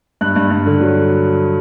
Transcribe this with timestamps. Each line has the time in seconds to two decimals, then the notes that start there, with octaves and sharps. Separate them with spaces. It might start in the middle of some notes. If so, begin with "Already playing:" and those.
0.21 G2 F#6
0.36 G2
0.50 G2
0.66 D3
0.80 F#3